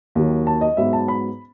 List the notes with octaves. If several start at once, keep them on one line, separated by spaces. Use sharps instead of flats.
D#2 D#3 F#3
A5
D#5
G#2 F#3 B3 E5
A5
B5